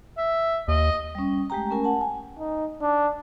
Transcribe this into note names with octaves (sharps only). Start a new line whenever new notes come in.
E5
D#2 D#5
G3 C#4
G#3 A3 G4 G5 A#5
A3 C#4 A#4 G#5
F#5 A5
G#5
D#4
D4